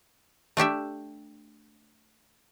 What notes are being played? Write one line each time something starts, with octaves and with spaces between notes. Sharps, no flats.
A3 D4 G4 E5